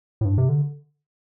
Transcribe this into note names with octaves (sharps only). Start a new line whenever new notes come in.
A2
G2
C3
D3